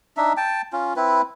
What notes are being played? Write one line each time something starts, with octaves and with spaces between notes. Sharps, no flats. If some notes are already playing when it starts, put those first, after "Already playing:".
D4 D#4 E5
G5 A5
C#4 F4
C4 E4 B4